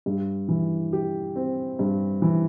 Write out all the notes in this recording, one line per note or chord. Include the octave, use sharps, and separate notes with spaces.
G2
E3
G4
C4
G2
E3